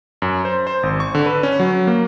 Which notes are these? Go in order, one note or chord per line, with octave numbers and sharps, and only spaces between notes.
F#2
C5
C5
G#1
C#6
D3
B4
C#4
F#3
A#3